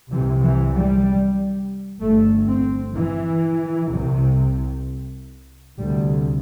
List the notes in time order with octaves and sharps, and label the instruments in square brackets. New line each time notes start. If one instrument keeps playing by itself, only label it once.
[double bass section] C2 C3 E3
E3
G3
G1 G2 A3
C4
E3
C2 C3
D2 C3 G3